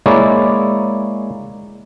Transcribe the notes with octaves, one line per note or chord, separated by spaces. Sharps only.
G#3 A#3 E4 C#5 D5